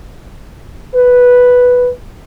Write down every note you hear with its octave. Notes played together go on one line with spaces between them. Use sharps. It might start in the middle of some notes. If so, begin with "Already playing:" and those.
B4